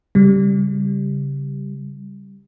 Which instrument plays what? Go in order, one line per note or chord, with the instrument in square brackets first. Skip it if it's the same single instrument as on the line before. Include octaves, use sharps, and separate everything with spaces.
[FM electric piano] C#3 G3